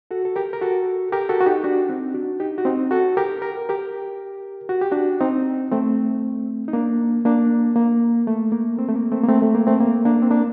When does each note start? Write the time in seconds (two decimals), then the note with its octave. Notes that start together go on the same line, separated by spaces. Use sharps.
0.11 F#4 A4
0.25 A4
0.36 G4 A#4
0.53 A#4
0.61 F#4 A4
1.12 G4 A#4
1.29 F#4 A4
1.41 F#4
1.46 D#4 G4
1.64 D4 F#4
1.89 C4 D#4
2.14 D4 F#4
2.40 D#4 G4
2.58 F#4
2.65 C4 D#4
2.91 F#4 A4
3.17 G4 A#4
3.42 A#4
3.69 G4 A#4
4.69 F#4
4.81 G4
4.92 D4 F#4
5.21 C4 D#4
5.71 A3 C4
6.68 D#4
6.73 A#3 D4
7.25 A#3 D4
7.76 A#3
8.27 A3
8.52 A#3
8.78 A3 C4
8.89 A3
8.96 A#3
9.12 A3 C4
9.24 A#3
9.29 A3 C4
9.42 A3
9.55 A#3
9.67 A3 C4
9.80 A#3
10.05 A#3 D4
10.22 C4
10.30 A#3 D4